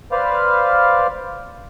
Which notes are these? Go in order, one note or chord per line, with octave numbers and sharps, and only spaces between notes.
B4 C5 D5 F5 F6